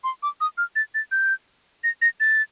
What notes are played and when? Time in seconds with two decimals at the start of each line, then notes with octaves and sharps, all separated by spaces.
0.04 C6
0.23 D6
0.41 D#6
0.58 F6
0.76 A6
0.95 A6
1.12 G6
1.84 A#6
2.02 A#6
2.20 A6